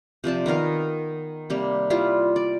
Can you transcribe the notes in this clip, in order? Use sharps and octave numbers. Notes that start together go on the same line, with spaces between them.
C3 F3 D5 A5
D#3 B3 A#4 F5
C3 G3 A#3
G3 E4 F4
D5